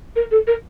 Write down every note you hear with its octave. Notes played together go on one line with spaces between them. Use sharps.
A#4
A4
A#4